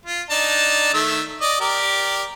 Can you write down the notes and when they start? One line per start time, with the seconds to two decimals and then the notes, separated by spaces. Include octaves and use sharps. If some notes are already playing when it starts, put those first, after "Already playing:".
0.06 F4
0.30 D4 D#4 A5
0.94 D#3 A3 E6
1.41 D5 D#5
1.61 G4 A#4 D5